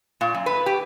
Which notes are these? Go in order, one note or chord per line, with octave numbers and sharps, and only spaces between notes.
A#2
F#2
B4
G4